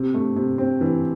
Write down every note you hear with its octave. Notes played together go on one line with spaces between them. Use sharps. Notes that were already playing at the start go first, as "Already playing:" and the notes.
Already playing: C3
A3
C3
C4
E3